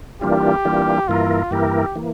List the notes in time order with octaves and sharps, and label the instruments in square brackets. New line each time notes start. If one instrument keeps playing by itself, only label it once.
[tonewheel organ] E3 G3 A#3 D4 F4 [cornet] G4
[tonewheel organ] E3 G3 A#3 D4 F4
[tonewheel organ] G2 E3 A#3 E4 A#4 [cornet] F4
[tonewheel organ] G2 E3 A#3 E4 A#4 [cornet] G4
[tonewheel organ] E3 A#3